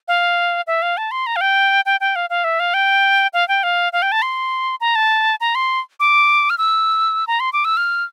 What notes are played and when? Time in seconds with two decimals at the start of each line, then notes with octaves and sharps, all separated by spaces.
0.08 F5
0.67 E5
0.82 F5
0.97 A5
1.11 C6
1.26 A#5
1.36 F5
1.41 G5
1.86 G5
2.00 G5
2.16 F5
2.30 F5
2.44 E5
2.60 F5
2.74 G5
3.34 F5
3.48 G5
3.63 F5
3.93 F5
4.02 G5
4.12 A5
4.22 C6
4.81 A#5
4.95 A5
5.41 A#5
5.55 C6
6.00 D6
6.50 F6
6.58 E6
7.27 A#5
7.40 C6
7.53 D6
7.65 E6
7.77 F6